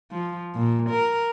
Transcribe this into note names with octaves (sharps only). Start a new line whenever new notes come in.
F3
A#2
A#4